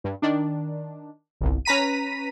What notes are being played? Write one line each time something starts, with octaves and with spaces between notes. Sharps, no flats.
G2
D#3 D4
G1 C2
C#4 B4 A#5 B6 D#7